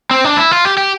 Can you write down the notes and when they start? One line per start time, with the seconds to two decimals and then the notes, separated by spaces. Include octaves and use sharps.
0.11 C4
0.25 D4
0.37 E4
0.51 F4
0.65 G4
0.77 G4